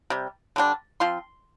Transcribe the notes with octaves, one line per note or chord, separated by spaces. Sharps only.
C3 G3
D3 G3 D4
F3 C4 F4 C6